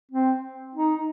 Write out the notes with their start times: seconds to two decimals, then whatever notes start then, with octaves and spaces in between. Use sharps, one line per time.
0.11 C4
0.75 D#4